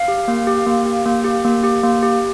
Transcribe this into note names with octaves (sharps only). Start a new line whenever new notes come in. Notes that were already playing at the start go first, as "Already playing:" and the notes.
Already playing: F5
G4
A#3
G4
A#3
G4
A#3
G4
A#3
G4
A#3
G4